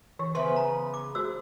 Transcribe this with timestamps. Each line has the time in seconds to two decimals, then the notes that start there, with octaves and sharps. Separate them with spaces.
0.19 E3 C#6
0.35 C#3 B3 B4 C5 E5 C6
0.56 A#5
0.94 D6
1.15 F#4 C5 E6